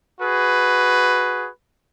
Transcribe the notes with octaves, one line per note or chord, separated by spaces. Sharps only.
F#4 G#4 B4